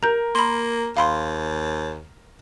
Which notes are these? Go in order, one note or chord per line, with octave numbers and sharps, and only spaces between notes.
A#4 A#5 G6
A#3 B5 C6
D#2 F5 B5 C6